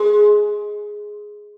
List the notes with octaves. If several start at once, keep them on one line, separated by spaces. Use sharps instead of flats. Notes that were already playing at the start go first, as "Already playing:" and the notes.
Already playing: G#3